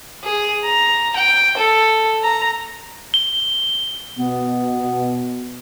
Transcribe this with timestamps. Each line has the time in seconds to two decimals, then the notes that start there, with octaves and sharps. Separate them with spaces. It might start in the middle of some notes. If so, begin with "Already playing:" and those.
0.25 G#4
0.64 A#5
1.17 G5
1.58 A4
2.23 A#5
3.14 G7
4.18 B2 B3